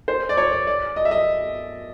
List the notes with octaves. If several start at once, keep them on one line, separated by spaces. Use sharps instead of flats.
C5
D5
C#5
D5
D5
D#5
E5
D#5